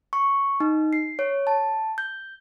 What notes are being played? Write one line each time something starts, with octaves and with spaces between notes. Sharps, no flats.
C#6
D#4
C7
C#5
A5
G6